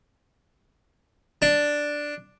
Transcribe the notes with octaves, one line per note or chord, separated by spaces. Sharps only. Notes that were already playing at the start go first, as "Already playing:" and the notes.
D4